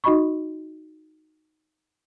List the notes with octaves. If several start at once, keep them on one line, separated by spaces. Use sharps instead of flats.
D#4 F#4 D#5 B5 C#6